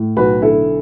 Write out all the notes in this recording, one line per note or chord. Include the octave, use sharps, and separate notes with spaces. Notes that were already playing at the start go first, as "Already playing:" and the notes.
Already playing: A2
B1 F#4 B4
D3 E4 A4